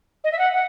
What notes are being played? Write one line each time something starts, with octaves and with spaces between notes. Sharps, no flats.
D#5
E5
F#5
F#5